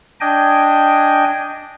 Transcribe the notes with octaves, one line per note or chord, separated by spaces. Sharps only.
D4 D#5 G5 G#5